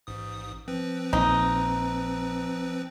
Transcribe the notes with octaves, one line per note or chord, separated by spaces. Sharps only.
A1 G#2 D#6
F3 C4 B4
A#1 D#4